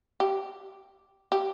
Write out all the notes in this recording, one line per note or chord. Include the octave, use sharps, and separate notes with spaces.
G4
G4